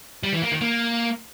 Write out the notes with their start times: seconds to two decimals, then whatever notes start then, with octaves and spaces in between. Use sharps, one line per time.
0.24 G3
0.33 E3
0.42 A#3
0.52 D#3
0.61 A#3